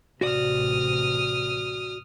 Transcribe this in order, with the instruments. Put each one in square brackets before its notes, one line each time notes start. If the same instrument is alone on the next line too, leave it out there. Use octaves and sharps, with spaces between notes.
[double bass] A1 C3 [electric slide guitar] F#4 D5 [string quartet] D#6 F6